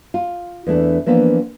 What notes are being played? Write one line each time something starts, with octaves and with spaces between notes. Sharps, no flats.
F4
E2 E3 A3 D4
E3 F3 A#3 B3 D4